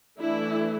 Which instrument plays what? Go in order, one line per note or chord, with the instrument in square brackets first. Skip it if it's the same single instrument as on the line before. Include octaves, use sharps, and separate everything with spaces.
[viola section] E3 A3 D4 E4